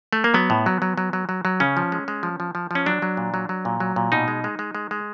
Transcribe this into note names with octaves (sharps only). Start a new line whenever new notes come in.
A3
A#3
F#3 B3
A2
F#3
F#3
F#3
F#3
F#3
F#3
C#3 C#4
F3
G#3
G#3
F3
F3
F3
F3 C#4
F#3 D4
F#3
A#2
F#3
F#3
A#2
F#3
A#2
B2 D#4
G#3
G#3
G#3
G#3
G#3